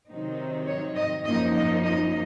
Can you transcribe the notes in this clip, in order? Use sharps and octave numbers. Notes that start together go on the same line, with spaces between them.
C3 D#3 F#3 C4 D#4
C#5
D#5
F#2 F3 A#3 D#4 D#5
D#5
D#5